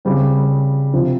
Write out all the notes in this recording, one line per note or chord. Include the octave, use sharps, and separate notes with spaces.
C#3 G3 C4
C3 F3